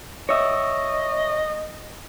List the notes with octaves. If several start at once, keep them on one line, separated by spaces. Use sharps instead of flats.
C#5 D#5 E5